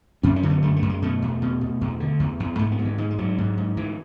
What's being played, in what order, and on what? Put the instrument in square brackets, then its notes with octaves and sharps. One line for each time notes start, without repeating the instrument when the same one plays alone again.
[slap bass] F#2 C#4
C#4
D3
B3
F#2 A3
A3
F#2
G#3
B2 A3
E2
B2
B2
E2
D3
E2
E2
G#2 A3
B3
G#2
E3
G#2 G#3
G#3
G#2 F#3
G#2
G#2
G#2 E3